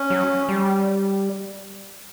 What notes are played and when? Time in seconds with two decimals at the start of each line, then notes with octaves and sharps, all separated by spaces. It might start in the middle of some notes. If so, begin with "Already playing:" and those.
Already playing: C#4
0.10 F#3
0.49 G3